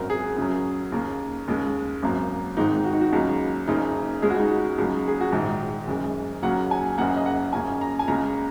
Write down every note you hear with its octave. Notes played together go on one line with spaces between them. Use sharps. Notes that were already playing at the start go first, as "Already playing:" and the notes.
Already playing: G#1 F#2 F#3 A#4
G#4
F#2 C#3 F#3
D#2 C#3 A#3
D#2 C#3 G#3
G#1 F#2 F#3 A#3
G#1 G#2 D#3 G#3 D#4
F#4
D#4
F#4
C#2 C#3 F#3 A#3
F#1 F#2 C#3 A#3 D#4
C#2 C#3 G#3 G#4
F#4
D#4
F#4
C#2 C#3 F#3 A#3
G#4
F#4
A#1 G#2 D#3 D#4
F#1 F#2 C#3 G#3
D#2 C#3 F#3 A#3 F#5
G#5
F#1 F#2 C#3 A#3 F#5
D#5
F#5
F#2 C#3 A#3 G#5
A#5
G#5
C#2 C#3 A#3 A#5